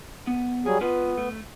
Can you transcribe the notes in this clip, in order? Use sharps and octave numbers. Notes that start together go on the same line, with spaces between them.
B3
F#3 G3 G#4 G#5
B3 F4 B4 D#5
A3